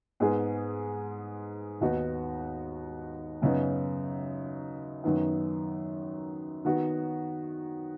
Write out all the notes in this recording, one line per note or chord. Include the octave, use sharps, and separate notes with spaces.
G#2 G#3 B3 G#4
D#2 D#3 B3 D#4 F#4
F#2 C#3 B3 D#4
F#2 D#3 B3
D#3 B3 F#4